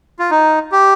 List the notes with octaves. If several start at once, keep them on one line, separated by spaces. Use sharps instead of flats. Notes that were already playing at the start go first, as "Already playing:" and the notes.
F4
D#4
G4